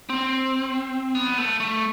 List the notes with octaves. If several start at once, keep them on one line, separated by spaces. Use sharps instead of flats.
C4
B3
A3
A3